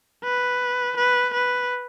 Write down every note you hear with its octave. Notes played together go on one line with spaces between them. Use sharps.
B4
B4
B4